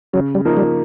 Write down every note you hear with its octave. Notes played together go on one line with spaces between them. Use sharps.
C#3 F#3
G3
F3 A#3 D#4
G3